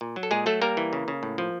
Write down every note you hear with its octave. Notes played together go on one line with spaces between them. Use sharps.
A#2
F#3
A4
A#2 G#3 G#4
F#3 A3 A4
G3 A#3 A#4
E3
C#3
C#3
A2
F3